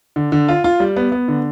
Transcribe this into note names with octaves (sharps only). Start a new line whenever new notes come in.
D3
D3
F4
F4
G3
B3
B3
D3